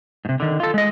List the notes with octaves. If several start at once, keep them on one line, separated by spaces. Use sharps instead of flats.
G#2 C3
D3 D#3
F4 A4
G#3 D#5